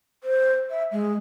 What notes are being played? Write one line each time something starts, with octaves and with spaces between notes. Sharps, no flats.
C5
E5
G#3